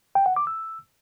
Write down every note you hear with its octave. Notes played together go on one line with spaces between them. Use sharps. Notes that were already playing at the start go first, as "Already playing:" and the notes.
G5
F#5
D6
E6